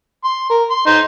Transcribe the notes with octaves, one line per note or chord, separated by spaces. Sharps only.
C6
A#4
C6
D#4 C6